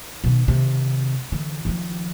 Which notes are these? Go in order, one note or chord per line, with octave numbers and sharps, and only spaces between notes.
B2 D#3
C3 D#3
D3 E3
D#3 F3